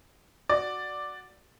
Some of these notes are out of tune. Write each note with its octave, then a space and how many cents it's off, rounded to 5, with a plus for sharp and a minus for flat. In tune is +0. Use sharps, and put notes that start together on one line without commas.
F#4 +0 D5 +0